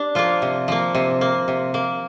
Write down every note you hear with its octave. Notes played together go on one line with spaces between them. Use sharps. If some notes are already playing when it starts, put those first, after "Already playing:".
Already playing: D4 G4
F3 A#3 F4
C3
F3 A#3
C3
A#3
C3
A#3